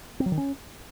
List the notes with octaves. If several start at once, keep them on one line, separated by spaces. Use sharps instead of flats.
C4
F#3
D#3
C#4